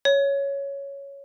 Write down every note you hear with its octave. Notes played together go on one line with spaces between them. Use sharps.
C#5